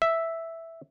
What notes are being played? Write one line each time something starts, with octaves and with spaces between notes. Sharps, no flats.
E5